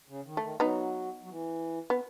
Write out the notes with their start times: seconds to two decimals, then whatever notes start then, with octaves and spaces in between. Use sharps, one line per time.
0.09 C#3
0.26 D#3
0.37 A3
0.43 D#3
0.60 F#3 B3 D#4
1.23 F#3
1.30 E3
1.90 B3